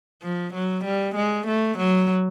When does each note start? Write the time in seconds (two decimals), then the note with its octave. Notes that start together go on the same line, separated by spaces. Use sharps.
0.22 F3
0.54 F#3
0.85 G3
1.15 G#3
1.47 A3
1.78 F#3